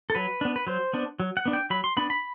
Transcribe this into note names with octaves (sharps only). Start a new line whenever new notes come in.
A4
F#3 B4
B3 D4
B4
F#3 C5
B3 D4
F#3
F#5
B3 D4
G5
F#3 B5
C6
B3 D4 B5
B5